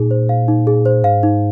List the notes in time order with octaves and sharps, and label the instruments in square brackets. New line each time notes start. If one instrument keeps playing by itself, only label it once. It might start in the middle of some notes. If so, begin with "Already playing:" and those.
Already playing: [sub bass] A#2 [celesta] D#4 G#4
[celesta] C5
F5
D#4
G#4
C5
[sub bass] G#2 [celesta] F5
[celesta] D#4